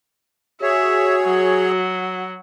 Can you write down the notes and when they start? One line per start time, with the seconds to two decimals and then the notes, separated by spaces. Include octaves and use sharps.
0.62 F#4 G#4 C#5 E5
1.24 F#3